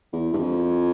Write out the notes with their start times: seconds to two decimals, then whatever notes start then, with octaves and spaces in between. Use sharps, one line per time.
0.13 E2
0.33 G2
0.39 F2